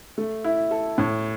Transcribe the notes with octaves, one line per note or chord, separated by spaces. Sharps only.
A3
E4
A4
A2